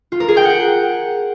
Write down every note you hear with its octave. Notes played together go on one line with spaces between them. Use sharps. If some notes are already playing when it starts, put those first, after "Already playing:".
F4
A#4
G#4
G5
F#5